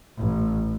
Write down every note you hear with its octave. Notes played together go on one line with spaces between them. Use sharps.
A1